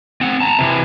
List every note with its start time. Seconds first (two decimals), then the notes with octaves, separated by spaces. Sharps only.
0.21 C4 F#5
0.40 A5 A#5
0.59 C3 E3